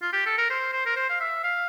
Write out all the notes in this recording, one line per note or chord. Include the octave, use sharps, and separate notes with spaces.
F4
G4
A4
A#4
C5
C5
A#4
C5
F5
E5
F5